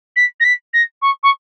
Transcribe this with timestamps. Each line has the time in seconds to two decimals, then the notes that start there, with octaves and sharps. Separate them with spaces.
0.16 B6
0.40 A#6
0.44 B6
0.73 A#6
1.02 C#6
1.23 C#6